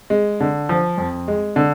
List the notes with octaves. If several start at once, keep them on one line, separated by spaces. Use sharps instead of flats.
G#3
D3
F3
F2
G#3
D3